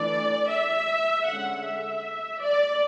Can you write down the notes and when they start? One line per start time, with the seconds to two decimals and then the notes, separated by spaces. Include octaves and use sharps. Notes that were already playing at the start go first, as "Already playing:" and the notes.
Already playing: E3 A3 D4 D5
0.51 E5
1.26 D3 G#3 C#4 F#5
1.64 E5
2.40 D5